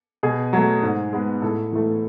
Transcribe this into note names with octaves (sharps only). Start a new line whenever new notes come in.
B2 G#4
F#3 A3
G#2
G#3 B3
A2 A4
E3 A3